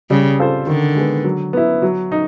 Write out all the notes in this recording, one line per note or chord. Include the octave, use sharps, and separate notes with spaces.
C#3 G3
C4 F4 A4 C5
D3 D#3
G#3 B3
F#3
B3 E4
F#3
D#4